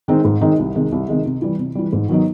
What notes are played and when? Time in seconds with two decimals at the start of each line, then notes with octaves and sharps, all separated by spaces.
0.08 D#3 G#3 C4 D#4
0.25 G#2
0.41 D#3 G#3 C4 D#4
0.59 C2
0.75 C3 D#3 G#3
0.92 C2
1.08 C3 D#3 G#3
1.25 C3
1.42 E3 G3
1.59 C3
1.75 E3 G3
1.93 G#2
2.09 D#3 F#3 B3 D#4